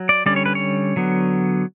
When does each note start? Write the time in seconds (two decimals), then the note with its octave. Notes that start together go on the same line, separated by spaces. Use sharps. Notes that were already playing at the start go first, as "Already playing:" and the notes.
Already playing: F#3
0.09 D5
0.26 D3 G3 C#4 D5
0.36 C#5
0.46 B4
0.55 C#5
0.96 D3 F#3 B3